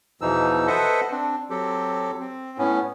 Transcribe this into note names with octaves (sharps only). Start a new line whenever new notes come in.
E2 B2 E3 F3 D#4 E6
A4 B4 C5 D#5 E5 F#5
C4 D4
F#3 C4 G4 A4
C4
A2 B3 C#4